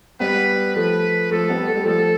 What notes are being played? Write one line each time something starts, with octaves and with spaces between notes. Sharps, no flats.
G3 B3 B4
F3 A3 B4
F3 A3 A4
G3 B3
A3
G3
F3 A3 A4